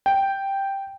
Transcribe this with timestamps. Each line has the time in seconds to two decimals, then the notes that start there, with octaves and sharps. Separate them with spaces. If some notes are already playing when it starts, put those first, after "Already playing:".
0.06 G5